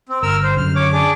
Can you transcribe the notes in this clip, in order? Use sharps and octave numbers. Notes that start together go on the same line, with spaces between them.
C4
G1 A#4 E6 F6
C5
F#2 D3 F6
C#5 D6
D4 G#4 D6